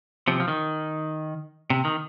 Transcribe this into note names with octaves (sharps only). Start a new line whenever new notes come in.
C3 F3
F3
D#3
C3
D#3